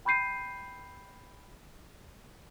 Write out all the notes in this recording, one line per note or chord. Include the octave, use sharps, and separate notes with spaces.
G5 B5 C#6 G6 C7 D#7